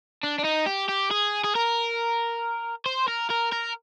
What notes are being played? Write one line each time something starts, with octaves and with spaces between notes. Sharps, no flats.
D4
D4
D#4
G4
G4
G#4
G#4
A#4
C5
A#4
A#4
A#4